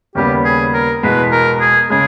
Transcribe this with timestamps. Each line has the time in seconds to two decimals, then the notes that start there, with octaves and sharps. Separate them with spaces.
0.15 D#2 C#3 G3 B3 G4
0.45 G#4
0.73 A#4
1.03 E2 B2 G#3 B3 B4
1.31 A#4
1.61 G#4
1.90 C#3 G#3 G#4